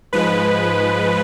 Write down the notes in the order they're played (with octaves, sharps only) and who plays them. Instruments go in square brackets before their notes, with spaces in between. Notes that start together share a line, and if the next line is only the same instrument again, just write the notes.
[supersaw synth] G#2 F3 G#3 B4